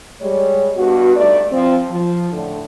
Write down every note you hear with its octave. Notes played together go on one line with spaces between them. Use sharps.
G3 G#3 C#5
G2 B2 B3 F#4
G2 A3 D#4 D5
F3 C4
F3
A2 D3